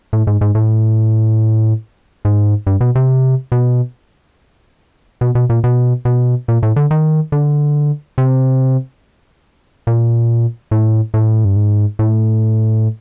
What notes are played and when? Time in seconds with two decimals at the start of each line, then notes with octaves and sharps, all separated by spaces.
0.13 A2
0.27 G#2
0.41 G#2
0.55 A2
2.25 G#2
2.67 G2
2.81 B2
2.95 C3
3.52 B2
5.21 B2
5.35 B2
5.50 A#2
5.64 B2
6.05 B2
6.48 A#2
6.63 A2
6.76 D3
6.91 D#3
7.32 D3
8.18 C3
9.87 A#2
10.71 A2
11.14 A2
11.45 G2
11.56 G#2
11.99 A2